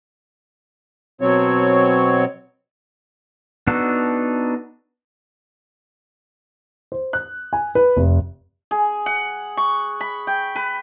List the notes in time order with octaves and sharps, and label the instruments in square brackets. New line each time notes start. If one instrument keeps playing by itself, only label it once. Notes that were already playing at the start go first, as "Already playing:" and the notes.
[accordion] B2 F#3 C4 C#5
[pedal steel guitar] B3 D4 D#4 F#4 A4
[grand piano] C5
F#6
G#5
B4
F1
[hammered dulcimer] G#4
F#5
C#6
B5
G5
B4